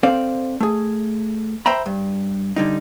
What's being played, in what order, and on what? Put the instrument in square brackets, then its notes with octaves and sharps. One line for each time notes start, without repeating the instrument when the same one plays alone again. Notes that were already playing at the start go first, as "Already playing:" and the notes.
[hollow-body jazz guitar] C4 A4 C5 D5 F5
A3 G#4
C5 E5 G5 A#5 B5
G2
D3 G3 D#4